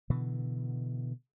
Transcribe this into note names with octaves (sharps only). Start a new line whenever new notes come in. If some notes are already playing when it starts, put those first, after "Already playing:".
B2 D3 E3